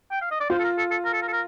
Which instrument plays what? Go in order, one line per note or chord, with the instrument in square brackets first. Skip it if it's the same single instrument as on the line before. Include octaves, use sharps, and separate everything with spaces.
[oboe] G5
F5
D#5
D5
[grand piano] F4 [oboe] C5
[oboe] A4
A#4
A4
A4
A#4
A4
A#4
A4
A#4